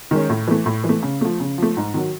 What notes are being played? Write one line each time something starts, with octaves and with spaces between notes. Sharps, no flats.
D#3 G#3 C#4
A2
E3 A3
A2
E3
A3
C#3
F3 A3
C#3
F3 A3
G#2
D#3 F#3